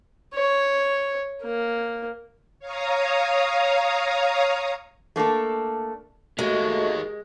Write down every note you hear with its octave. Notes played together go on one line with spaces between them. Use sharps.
C#5
A#3
C#5 F5 A#5 D#6
A3 A#3 D4 A4
G#3 A3 F#4 G4 A#4 D#5